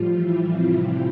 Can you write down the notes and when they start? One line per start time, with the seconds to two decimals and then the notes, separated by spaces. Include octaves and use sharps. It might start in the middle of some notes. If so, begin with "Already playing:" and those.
Already playing: A2 F3 G3 F4
0.11 E3 E4
0.49 C3 C4